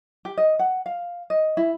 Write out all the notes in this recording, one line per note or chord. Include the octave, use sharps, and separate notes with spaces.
G4
D#5
F#5
F5
D#5
E4